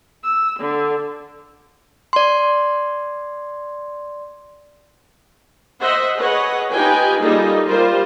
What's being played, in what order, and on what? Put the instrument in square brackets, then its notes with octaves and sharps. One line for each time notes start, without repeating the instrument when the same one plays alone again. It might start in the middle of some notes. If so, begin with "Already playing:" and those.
[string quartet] E6
D3
[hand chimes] D5 C6
[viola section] C5 D#5 E5 F#5
G#4 B4 C#5 D#5 F#5
D#4 F4 G4 B4 G5 G#5
G3 A#3 D#4 F4 G#4 A4
G3 F4 A#4 C5